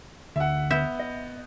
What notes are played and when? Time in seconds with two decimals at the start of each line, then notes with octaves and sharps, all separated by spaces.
0.36 D2 E5 F#5
0.71 B3 E5 G6
1.00 D#5